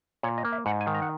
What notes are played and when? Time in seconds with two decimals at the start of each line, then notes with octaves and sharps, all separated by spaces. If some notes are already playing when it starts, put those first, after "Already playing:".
0.23 A#2 C#5
0.38 D#5
0.45 A#3
0.52 E5
0.66 G#2 F#5
0.81 G#5
0.87 D#3
0.95 A#5
1.02 F#5